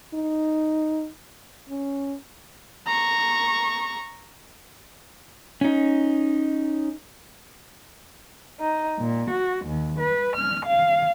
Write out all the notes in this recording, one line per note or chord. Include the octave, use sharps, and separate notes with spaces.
D#4
C#4
A#5 C#6
C#4 D#4
D#4
A#2
F#4
D#2
B4
F6
F5